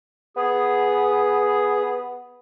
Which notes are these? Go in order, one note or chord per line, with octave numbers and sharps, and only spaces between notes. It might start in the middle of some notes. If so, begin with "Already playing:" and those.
B3 G#4